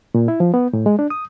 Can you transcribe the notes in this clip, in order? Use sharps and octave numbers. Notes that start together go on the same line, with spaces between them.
A#2
E4
F3
B3
A2
G#3
D4
D#6